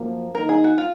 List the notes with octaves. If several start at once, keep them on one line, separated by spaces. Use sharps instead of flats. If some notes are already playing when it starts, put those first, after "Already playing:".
Already playing: F#2 F3 A#3
D#3 A#3 D#4 A#4
G#4
F#4
F4